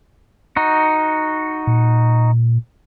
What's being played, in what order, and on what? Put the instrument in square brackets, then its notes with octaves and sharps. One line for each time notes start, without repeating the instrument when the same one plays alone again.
[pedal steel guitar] D#4 F#4
[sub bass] A#2